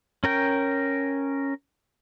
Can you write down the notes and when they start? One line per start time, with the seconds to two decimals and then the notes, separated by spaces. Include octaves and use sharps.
0.24 C#4 A#4 G5